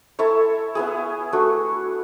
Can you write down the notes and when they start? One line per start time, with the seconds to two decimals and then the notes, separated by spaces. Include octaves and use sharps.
0.19 E4 A4 C#5 E5
0.75 B3 E4 G#4
1.33 A3 D4 F#4